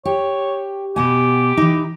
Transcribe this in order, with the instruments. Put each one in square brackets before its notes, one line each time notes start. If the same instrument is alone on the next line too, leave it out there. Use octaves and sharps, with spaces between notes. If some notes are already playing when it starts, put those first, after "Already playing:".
[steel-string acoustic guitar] G4 [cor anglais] C#5
[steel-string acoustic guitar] B2 B3 G#5 [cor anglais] G4
[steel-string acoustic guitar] E3 D#4